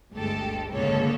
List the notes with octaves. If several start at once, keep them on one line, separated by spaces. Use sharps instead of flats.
G1 D2 G#3 G4 A4
G#1 C#2 A#2 D3 A4 C#5